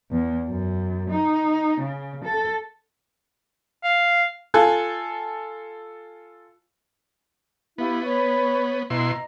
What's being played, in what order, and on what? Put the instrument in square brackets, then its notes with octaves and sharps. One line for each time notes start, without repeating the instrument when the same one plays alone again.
[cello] E2
F#2
D#4
C#3
A4
[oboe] F5
[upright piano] F4 A4 G#5 F#6
[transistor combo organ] B3 [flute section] E4 G4 F5
[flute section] B4 C#5 C#6
[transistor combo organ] B2 E4 C6 [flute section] D#5 A#5